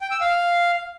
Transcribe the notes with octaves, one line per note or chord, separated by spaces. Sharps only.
G5
E6
F5